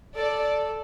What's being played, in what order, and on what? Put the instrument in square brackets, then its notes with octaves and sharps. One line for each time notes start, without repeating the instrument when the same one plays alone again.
[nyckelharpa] A4 [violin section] D5